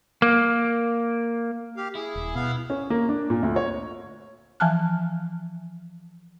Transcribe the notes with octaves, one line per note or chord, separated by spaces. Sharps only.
A#3
G4 F5
E4 G#4
D#1
B2 B3 F5
C#4
A#3
D4
A#2
D2
C#5
E3 F3 G#5 A5 F6 F#6